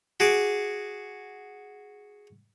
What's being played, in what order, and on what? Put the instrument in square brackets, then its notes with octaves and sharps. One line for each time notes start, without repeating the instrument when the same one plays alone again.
[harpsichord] F#4 G#4 D6